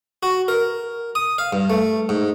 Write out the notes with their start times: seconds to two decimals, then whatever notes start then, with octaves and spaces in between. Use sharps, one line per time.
0.23 F#4
0.48 A#4
1.15 D#6
1.38 F5
1.53 G2
1.70 A3
2.09 G#2